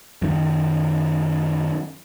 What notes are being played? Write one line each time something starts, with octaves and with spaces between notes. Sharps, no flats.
F#2 D#3